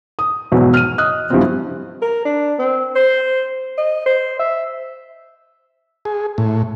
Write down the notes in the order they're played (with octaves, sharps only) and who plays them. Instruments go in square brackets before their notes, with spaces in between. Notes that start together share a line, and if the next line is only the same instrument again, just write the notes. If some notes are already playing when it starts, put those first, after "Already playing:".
[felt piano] D#6
B1 E2 G#2 B2 F#3
F6 D#7
D#5 D#6 F6 F#6
G2 E3 F3 G3 B3 C4
[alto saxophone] A#4
D4
C4
C5
D#5
C5
E5
[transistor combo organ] G#4
A2